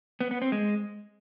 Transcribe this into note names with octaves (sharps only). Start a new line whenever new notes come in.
B3
B3
C4
G#3